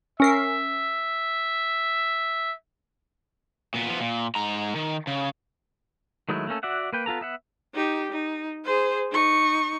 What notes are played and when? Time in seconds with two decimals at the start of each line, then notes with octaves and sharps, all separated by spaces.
0.20 C#4 A#4 E5 C7
3.74 A#2 B3
3.88 F3 B3
4.00 A#2
4.35 G#2 A#5
4.76 D#3
5.07 C#3
6.29 D#3 F#3 G#3 A3 E4
6.47 A3 A#3 C#4 A4
6.63 F#4 D5 E5 F#5
6.93 A#3 B4 G5
7.06 B3 F4 A4 A#5
7.21 B3 E5 F#5
7.74 D#4 G4
8.12 D#4
8.65 G#4 C5
9.12 D#4 C#6